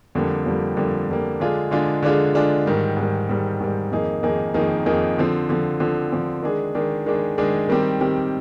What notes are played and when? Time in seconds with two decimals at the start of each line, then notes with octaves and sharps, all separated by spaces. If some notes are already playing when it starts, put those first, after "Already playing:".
0.15 F2 D3 G3 A#3
0.46 F2 D3 G3 A#3
0.77 F2 D3 G3 A#3
1.09 F2 D3 G3 A#3
1.40 D3 G#3 D4 F4 G#4
1.71 D3 G#3 D4 F4 G#4
2.03 D3 G#3 D4 F4 G#4
2.34 D3 G#3 D4 F4 G#4
2.66 G#2 D#3 G3
2.97 G#2 D#3 G3
3.29 G#2 D#3 G3
3.60 G#2 D#3 G3
3.91 F2 D#3 A#3 D#4 G#4
4.23 F2 D#3 A#3 D#4 G#4
4.54 F2 D#3 A#3 D#4 G#4
4.86 F2 D#3 A#3 D#4 G#4
5.18 D3 F3 C4
5.49 D3 F3 C4
5.80 D3 F3 C4
6.12 D3 F3 C4
6.43 D#3 G#3 D4 G#4
6.75 D#3 G#3 D4 G#4
7.06 D#3 G#3 D4 G#4
7.38 D#3 G#3 D4 G#4
7.69 D#3 G3 C4 G4
8.01 D#3 G3 C4 G4